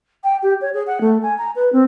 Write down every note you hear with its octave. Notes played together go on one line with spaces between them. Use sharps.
G5
G4
C#5
G#4
F#5
A3
G#5
A#5
B4
C4